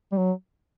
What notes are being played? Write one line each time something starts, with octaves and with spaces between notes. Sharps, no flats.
G3
F#3